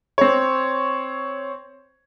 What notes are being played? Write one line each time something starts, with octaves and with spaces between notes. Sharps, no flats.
C4 C#5